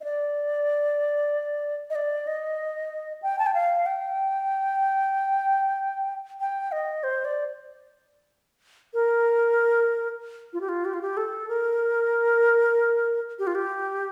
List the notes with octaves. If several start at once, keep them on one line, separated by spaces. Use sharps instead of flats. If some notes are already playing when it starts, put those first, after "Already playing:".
D#5
D5
D#5
D5
D#5
G5
A5
G5
F5
G5
G5
D#5
C5
D5
A#4
F4
G4
F4
G4
F4
G4
A4
A#4
G4
F4
G4